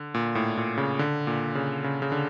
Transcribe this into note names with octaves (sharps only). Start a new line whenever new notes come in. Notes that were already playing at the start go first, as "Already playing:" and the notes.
Already playing: D3
A#2
A2
A#2
C#3
D3
A#2
C#3
C#3
C#3
D3